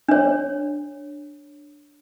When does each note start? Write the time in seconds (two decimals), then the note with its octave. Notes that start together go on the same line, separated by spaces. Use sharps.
0.08 D4 C#5